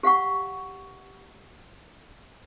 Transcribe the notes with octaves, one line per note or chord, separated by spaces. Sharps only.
G4 F5 F#5 C#6